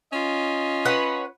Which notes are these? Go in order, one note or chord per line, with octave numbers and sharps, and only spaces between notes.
C#4 F4 D#5
B4 C#5 F#5